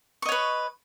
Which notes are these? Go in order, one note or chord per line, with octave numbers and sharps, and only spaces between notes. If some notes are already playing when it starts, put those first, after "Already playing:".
B4 C#5 D#5 C#6